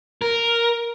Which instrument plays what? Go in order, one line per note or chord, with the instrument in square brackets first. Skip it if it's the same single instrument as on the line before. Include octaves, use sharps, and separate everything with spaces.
[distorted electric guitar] A#4